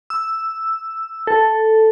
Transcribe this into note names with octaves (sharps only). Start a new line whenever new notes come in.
E6
A4